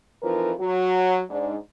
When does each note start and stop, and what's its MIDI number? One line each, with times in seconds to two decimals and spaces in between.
0.22 0.52 41
0.22 0.52 52
0.22 0.52 53
0.22 0.52 63
0.22 0.52 70
0.22 0.52 71
0.59 1.22 54
0.59 1.22 66
1.29 1.54 44
1.29 1.54 62